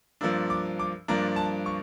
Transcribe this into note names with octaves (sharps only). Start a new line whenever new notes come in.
G2 F3 A#3 D4 E6
D6
D6
G2 F3 A#3 D4 A#5
A5
C#6